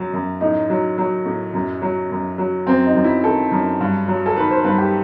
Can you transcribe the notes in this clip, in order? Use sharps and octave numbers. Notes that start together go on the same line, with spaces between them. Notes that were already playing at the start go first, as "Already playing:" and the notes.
Already playing: F#2 F#3
F#2
A2 D#4
F#3
F#3
A2
F#2
F#3
F#2
F#3
F#2 C4
D#4
F#2
E4
D#3 A4
F#2
G2
F#3
A4
D#3 B4
C5
G2 B4
G4